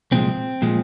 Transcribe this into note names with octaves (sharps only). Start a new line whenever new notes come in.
C2 A#2 F3 G#3 C4
A#2 F3 G#3